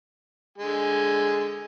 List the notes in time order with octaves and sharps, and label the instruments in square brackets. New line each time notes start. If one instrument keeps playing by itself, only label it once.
[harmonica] D3 G#3 G#5